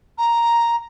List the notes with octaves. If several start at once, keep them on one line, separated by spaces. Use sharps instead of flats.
A#5